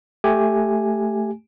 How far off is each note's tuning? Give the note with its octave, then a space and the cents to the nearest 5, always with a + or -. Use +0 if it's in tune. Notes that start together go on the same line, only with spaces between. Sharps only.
A3 +0 G4 +5 G#5 +0